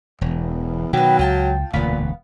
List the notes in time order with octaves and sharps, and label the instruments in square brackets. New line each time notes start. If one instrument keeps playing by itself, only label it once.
[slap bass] E1 [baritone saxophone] E2
[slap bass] B2 D#3 [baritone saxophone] F#3 [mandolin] G4 B4
[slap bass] C#2 [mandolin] F4 G5 A5
[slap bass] E1 D2 [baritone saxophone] A#2 [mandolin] B3 F5 B5